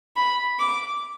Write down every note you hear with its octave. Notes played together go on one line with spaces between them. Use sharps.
B5
D6